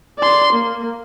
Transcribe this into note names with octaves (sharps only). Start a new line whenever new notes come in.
D5 C6
A#3